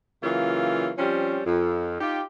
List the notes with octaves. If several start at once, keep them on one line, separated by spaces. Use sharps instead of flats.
C#3 E3 F#3 A#3 F4
F3 G3 C4 C#4
F2
D#4 F4 G4